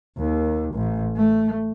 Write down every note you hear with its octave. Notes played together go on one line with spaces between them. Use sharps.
D#2
A1
A3